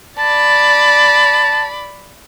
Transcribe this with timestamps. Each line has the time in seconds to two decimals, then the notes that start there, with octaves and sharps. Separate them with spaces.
0.19 D5 A5 B5